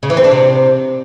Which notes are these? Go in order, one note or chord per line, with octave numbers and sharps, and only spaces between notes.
C#3
E3
C4
D4
C3